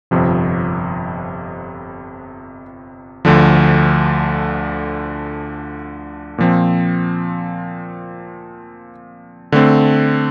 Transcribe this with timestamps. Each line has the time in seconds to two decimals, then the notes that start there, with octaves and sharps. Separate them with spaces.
0.11 G1 F2 C3 F3
3.25 D2 D3 F3
6.38 A#2 F3 C4
9.52 D3 A3 C4